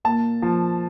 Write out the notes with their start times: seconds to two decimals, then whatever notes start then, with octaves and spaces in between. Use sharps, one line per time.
0.05 A#2 A5
0.42 F3